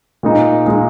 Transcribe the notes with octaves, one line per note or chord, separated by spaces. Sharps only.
A#2 G#3 D#4
A#2 G#3 D#4